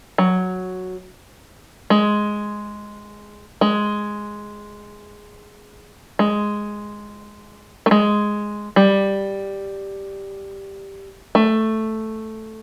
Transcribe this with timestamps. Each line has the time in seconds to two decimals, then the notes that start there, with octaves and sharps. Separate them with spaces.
0.18 F#3
1.90 G#3
3.61 G#3
6.19 G#3
7.86 A3
7.91 G#3
8.76 G3
11.35 A3